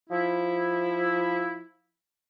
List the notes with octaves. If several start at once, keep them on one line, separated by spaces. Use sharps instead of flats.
F3 E4